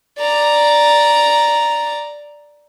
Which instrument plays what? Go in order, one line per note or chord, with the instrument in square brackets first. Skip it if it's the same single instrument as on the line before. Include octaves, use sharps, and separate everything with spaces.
[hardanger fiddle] D5 A#5